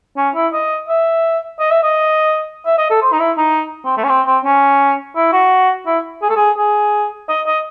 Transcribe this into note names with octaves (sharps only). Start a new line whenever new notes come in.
C#4
E4
D#5
E5
D#5
E5
D#5
E5
D#5
A4
C5
D#4
E4
D#4
C4
A3
C#4
C4
C4
C#4
E4
F#4
E4
G#4
A4
G#4
G#4
D#5
D#5